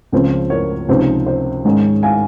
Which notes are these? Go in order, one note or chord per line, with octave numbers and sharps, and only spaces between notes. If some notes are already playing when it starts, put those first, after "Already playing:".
C#2 C#3 F3 C4
A#4 C#5
C#2 C3 F3 C4 D#4
C5
G#2 D#3 G#3 C#4
F5 G#5